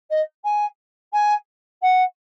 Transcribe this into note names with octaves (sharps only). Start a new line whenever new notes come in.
D#5
G#5
G#5
F#5